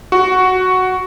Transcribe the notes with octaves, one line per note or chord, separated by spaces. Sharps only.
F#4